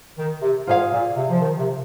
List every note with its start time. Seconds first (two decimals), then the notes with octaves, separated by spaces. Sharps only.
0.18 D#3
0.42 C3
0.67 G#2 F4 G#4 F5
0.92 A#2
1.16 C3
1.29 F3
1.41 D#3
1.59 C3